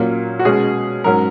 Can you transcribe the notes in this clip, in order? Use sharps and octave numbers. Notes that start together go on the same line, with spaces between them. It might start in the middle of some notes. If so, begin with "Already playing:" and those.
Already playing: A#2 F#3 A#3 C#4
F#4
B2 G#3 C#4 G#4
G#2 F#3 C#4 A#4